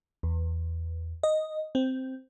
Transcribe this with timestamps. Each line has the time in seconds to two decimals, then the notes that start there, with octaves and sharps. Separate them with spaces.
0.23 E2
1.23 D#5
1.75 C4